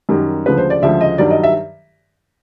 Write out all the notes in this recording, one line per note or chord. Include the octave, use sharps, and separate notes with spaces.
F#2 D#3 G3
D2 C#3 F3 G#3 B4
C5
D5
D2 C#3 F3 G#3 E5
D#5
G2 D#3 F#3 D5
D#5
E5